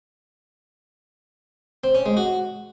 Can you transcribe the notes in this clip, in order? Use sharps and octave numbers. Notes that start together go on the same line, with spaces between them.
C4
C#4
G#3
F#4